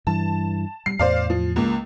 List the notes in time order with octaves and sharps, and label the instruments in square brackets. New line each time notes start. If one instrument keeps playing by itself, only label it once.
[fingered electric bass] G2 E3 [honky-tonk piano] A5
[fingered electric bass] G3 [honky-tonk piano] C7
[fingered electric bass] E2 A2 [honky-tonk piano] C5 D5 F5
[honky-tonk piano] F3
C#2 A#3